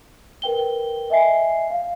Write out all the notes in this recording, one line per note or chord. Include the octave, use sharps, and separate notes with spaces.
A#4 B4 G5 G7
D#5 E5 G#5 C7
F5